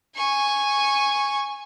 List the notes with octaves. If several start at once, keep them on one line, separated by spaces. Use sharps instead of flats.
G#5 C#6